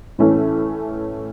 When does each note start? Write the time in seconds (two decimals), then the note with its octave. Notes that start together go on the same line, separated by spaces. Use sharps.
0.19 A2 E3 A3 C#4